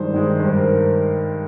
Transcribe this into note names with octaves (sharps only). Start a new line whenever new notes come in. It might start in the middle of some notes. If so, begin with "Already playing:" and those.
Already playing: G2 D#3 G#3 C5 D5
D#3 G#3
G2 C5
A#4